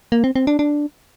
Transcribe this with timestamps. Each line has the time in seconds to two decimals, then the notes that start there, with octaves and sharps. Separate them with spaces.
0.12 A#3
0.24 C4
0.36 C4
0.47 D4
0.59 D4